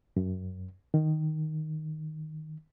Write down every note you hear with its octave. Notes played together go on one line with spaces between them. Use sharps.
F#2
D#3